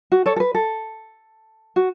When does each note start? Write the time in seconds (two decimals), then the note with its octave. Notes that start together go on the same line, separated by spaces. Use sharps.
0.12 F#4
0.26 A4 C#5
0.36 A4
0.40 B4
0.55 A4
1.76 F#4